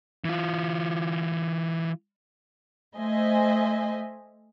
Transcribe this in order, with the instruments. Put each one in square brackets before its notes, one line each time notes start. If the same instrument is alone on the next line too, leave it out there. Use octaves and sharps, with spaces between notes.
[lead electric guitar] E3 F4
[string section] A3 C5 D#5 E5 G#5